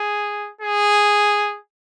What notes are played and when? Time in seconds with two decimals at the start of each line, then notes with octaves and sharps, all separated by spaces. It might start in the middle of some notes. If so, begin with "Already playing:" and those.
Already playing: G#4
0.61 G#4